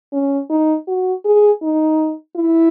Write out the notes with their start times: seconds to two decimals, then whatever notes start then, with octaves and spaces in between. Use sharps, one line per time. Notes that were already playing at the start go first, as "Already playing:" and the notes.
0.13 C#4
0.50 D#4
0.88 F#4
1.25 G#4
1.62 D#4
2.36 E4